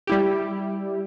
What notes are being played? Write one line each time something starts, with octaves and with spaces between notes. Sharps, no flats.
G3 E4 G4